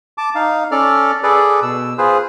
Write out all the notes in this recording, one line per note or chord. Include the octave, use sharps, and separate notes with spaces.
A5 D6
D#4 F5
C#4 A4 D5 F6
G#4 A4 B4 D5
B2 E6
F4 G#4 B4 C5